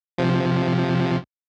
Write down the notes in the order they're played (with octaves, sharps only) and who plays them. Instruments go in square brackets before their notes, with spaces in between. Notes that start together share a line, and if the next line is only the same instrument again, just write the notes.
[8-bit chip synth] C3 F3